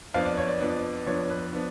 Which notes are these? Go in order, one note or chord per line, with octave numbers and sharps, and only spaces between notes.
F2 F3 B3 D4 F5
D5
C#5
D5
F2 F3 B3 D4
F2 F3 B3 D4 C#5
B4
F3 B3 D4